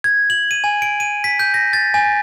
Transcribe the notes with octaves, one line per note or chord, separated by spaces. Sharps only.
G#6
F#7
D#7
G#5
D7
D#7
B6
G6
A#6
A6
G#5